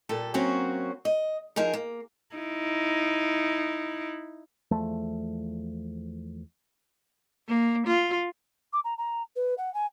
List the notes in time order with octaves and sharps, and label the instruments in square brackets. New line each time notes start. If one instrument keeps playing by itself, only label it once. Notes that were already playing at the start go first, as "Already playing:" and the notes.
[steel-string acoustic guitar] A#2 G3 A4
F#3 A#3 C4 C#4 F#4
D#5
F3 D#4 G#4 A#4
A#3
[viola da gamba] D#4 E4
[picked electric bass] E2 F3 A3
[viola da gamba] A#3
F4
[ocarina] D6
A#5
A#5
B4
F#5
G#5